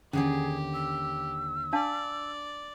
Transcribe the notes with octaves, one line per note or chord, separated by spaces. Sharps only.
D#2 G#2 D3 C#4 G4 G#4 F#5
E6
D4 D5 F5 A5